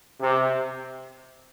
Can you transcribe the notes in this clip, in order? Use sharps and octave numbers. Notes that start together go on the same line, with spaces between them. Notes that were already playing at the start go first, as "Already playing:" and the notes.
C3